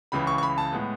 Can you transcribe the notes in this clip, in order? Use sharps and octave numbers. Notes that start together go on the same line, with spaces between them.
C#2 C#3 E3 B5
C#6
C#6
B5
A5
A2 G#3 B3